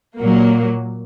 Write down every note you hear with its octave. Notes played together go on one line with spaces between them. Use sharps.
A#2 F#3 A#3